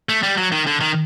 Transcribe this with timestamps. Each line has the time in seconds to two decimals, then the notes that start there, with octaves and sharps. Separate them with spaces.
0.09 A3
0.23 G3
0.38 F#3
0.52 D#3
0.67 D3
0.81 D#3